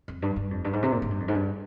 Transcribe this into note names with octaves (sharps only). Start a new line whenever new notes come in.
F2
G2
G2
F2
G2
G#2
C3
A#2
G#2
G2
F2
G#2
G2